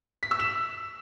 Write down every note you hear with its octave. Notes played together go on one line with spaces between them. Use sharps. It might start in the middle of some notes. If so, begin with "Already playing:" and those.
B6
E6
E7